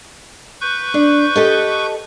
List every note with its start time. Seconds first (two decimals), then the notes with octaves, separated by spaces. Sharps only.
0.61 B4 C#6 G6
0.94 D4
1.35 G4 A4 D#5